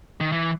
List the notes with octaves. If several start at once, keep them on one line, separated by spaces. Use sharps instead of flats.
D#3
E3